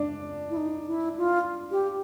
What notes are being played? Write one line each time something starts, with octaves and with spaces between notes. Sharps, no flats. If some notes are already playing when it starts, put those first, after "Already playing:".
Already playing: D4
E4
D#4
E4
F4
G4